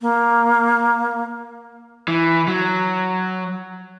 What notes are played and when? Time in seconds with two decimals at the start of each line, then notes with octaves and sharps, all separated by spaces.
0.01 A#3
2.08 E3
2.48 F#3